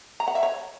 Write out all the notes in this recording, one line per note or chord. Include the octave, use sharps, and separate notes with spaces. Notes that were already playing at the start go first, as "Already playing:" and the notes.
A#5
F#5
E5
C#5